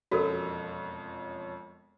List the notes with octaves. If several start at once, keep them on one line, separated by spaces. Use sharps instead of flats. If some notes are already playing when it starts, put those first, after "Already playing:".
E1 F2 C#4 F#4 A4 A#4